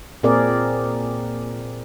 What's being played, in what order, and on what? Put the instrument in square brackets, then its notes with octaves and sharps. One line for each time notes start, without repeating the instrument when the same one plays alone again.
[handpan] A#2 C4 G#4 A#4 D5